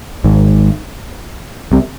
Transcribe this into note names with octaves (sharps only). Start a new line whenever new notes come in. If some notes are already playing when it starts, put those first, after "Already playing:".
G#1 G#2
C2 C3